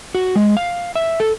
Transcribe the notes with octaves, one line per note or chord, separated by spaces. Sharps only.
F#4
G#3
F5
E5
A4